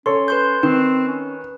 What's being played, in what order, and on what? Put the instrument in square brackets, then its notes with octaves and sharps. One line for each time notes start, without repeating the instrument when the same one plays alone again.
[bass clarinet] C#4 [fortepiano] A4 C#5 [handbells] C6
[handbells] B4 C6 G6
[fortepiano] D#3 [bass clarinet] C4 [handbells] B4
[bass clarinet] C#4